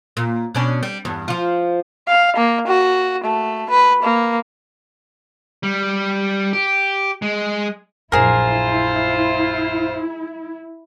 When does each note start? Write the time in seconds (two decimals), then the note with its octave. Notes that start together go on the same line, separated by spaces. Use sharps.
0.17 A#2
0.55 B2 C#4 D4
0.83 G3
1.05 E2 G2
1.28 F3 F4
2.08 F5
2.37 A#3
2.67 F#4
3.24 A3
3.70 B4
4.03 A#3
5.63 G3
6.53 G4
7.22 G#3
8.12 A#1 F#2 E4 F4 G#4 A#4 C5